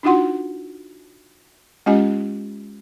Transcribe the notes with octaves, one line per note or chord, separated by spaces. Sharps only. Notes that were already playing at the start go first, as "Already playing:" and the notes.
D4 D#4 F4 F#4 F#5 C6
G#3 C#4 F4 G4 D#5 G#5